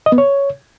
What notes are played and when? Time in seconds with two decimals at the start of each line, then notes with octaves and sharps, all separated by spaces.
0.06 D#5
0.12 B3
0.18 C#5